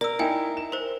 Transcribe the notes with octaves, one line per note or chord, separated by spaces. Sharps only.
A#4 D5 E6
D#4 E4 G5 G#5
E7
A#4 C5